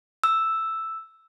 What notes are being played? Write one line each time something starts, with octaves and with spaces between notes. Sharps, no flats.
E6